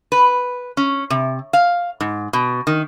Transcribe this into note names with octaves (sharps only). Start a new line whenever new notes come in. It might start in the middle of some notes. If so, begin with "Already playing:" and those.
B4
C#4
C3
F5
G#2
B2
D#3